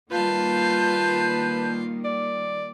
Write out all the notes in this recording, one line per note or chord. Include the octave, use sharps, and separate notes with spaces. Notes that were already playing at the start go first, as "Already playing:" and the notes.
D#3 G3 A#3 F4 B4 F5 A5 G6
D5